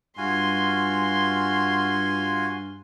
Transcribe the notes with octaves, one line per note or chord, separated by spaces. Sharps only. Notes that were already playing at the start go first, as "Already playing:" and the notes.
G2 F4 F#4 G#5 C6